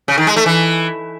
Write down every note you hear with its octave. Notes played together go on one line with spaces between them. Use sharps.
C#3
D#3
G#3
A3
E3